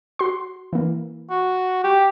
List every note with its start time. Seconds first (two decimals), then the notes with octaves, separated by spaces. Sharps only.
0.19 F#4 C6
0.73 E3 A#3
1.30 F#4
1.84 G4